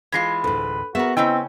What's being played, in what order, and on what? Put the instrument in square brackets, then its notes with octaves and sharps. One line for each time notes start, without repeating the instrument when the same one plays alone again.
[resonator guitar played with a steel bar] E3 G#3 F4 [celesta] G#6 A#6 C7
[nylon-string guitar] D2 A2 [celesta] A4 [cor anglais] B4
[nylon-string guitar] B3 [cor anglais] F#4 [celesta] G#4 [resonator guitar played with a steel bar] A#4 E5
[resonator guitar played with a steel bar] C#3 C#4 G5 [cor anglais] C4 [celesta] E4 D#5 E6